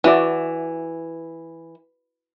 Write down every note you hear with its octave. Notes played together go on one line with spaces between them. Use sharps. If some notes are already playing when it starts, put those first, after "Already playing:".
E3 E4 F#4 D5